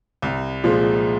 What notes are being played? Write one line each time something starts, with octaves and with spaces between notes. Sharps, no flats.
C2
A#2 F3 G#3